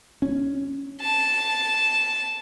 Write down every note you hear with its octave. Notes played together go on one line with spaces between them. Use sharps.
C#4
A5